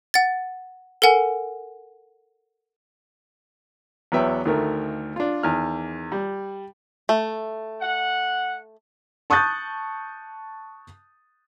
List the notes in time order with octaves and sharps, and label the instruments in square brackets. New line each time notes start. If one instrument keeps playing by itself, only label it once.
[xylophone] F#5 A6
A4 A#4 F#5 G#5
[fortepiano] E2 F#3 B3 B4 E5 G5
D2 D#3 A3 A#4
D4 F4
E2 D#3 F6
G3
[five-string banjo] A3
[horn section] F#5
[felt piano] A5 C#6 D#6 F#6 G6 A6